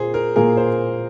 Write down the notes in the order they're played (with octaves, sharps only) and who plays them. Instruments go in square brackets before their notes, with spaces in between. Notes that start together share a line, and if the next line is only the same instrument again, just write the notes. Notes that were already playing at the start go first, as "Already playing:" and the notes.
Already playing: [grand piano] A#2 A#3 [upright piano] G#4 C5
[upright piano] A#4
[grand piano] A#2 A#3 G#4 [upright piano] A#4
[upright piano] C5